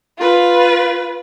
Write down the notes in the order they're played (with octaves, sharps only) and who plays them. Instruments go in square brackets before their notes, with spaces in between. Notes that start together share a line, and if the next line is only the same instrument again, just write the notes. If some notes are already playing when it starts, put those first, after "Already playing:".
[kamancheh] F4 B4